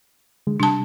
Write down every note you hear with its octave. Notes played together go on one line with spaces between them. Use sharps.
D3 G#3
C3 G3 D4 A5